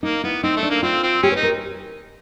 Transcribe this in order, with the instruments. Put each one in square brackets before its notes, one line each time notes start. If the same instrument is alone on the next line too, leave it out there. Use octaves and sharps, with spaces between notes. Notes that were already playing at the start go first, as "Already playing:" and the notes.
[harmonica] A#3 [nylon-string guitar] D#4
[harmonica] B3 [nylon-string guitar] E4
[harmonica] C4 [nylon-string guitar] D#4
[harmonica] A3
[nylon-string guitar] D4
[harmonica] A#3
[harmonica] C4 [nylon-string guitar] F4
[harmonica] C4
[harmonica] C#4 [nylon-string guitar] G4
[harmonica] D#4 [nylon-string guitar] B4
[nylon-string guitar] A#4